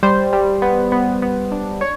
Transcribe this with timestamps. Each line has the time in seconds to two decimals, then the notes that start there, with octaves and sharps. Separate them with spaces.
0.03 G3 C5
0.33 G3
0.62 B3
0.92 B3
1.22 B3
1.52 D4
1.81 C#5